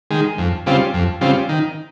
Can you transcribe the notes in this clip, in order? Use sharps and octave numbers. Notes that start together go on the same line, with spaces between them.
D#3 G#3
F2
C#3 G3 C4 F4
F2
C#3 G3 C4 F4
D#3